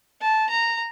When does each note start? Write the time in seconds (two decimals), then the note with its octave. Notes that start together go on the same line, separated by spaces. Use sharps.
0.21 A5
0.50 A#5